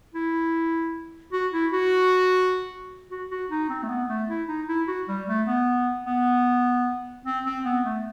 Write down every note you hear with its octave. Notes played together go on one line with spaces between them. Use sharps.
E4
F#4
E4
F#4
F#4
F#4
D#4
C4
A3
B3
A3
E4
D#4
E4
F#4
G3
A3
B3
B3
C4
C4
B3
A3